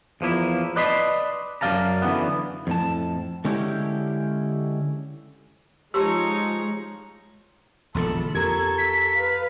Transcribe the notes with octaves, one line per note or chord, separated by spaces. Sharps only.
E2 F3 A#3 E4
B4 D5 D#5 A5 B5 C6
F#2 D#3 D5 F5 A5 A#5
D3 E3 B3
F2 A2 A5
D3 G#3 C#4 E4 G4
F3 G#3 D#4 G4 C#5 A5 C6 C#6
E1 A#1 D3 A4 B5 C6
F2 G4 A4 A#4 A#5 G#6
B6
B4 F5